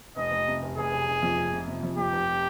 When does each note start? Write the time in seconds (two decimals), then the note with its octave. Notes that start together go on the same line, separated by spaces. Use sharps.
0.16 F1 D#5
0.32 F1
0.48 C3
0.63 F1
0.77 F1 G#4
0.92 F1
1.08 F1
1.22 F2
1.38 F1
1.52 C3
1.67 C3
1.83 F2
1.97 F2 G4
2.13 F1